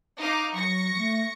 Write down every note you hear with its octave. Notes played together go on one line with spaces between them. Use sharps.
D#4 F5 D6
F#3 C#6 A#6 C#7
A3